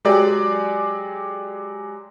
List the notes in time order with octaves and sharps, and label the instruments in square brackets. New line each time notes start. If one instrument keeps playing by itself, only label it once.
[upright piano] F#3 G#3 G4 G#4 D5